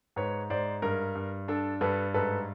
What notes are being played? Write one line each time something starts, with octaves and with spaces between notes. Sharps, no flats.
G#2 B4 C#5
G#2 C5 D5
G2 A#4
G2
D4 A4
G2 A4 B4
G#2 A4 B4